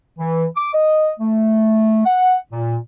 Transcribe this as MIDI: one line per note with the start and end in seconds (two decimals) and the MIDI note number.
0.19 0.46 52
0.56 0.70 86
0.74 1.11 75
1.20 2.03 57
2.05 2.37 78
2.52 2.77 46